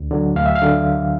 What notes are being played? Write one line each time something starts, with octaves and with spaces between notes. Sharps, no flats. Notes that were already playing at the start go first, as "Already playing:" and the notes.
Already playing: D2
D3 F#3
D2 F5
E5
F5
D3 F#3